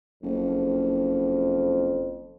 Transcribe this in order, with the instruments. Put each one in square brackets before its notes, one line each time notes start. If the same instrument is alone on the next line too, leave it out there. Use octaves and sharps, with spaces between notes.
[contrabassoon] F#1 [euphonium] F2